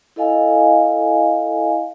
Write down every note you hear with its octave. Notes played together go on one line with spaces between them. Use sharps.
E4 A4 D#5 F5 G#5